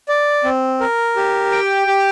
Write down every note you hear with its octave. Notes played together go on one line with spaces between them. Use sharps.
D5
C4
A#4
G4
G5
G4